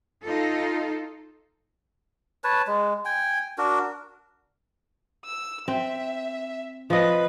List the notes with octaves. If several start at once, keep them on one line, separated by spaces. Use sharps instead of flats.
D#4 F4 A4
B4 C#5 A5
G#3
G5 G#5
D4 F#4 A#4
E6
C4 E5
F3 B4 D#5